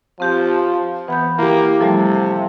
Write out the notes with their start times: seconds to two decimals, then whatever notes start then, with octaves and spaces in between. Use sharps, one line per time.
0.20 F3 C4 G4 G6
1.08 E3 B3 B5 G6
1.38 A#3 E4 G4
1.81 C3 F3 G3 A3 A4
2.14 F5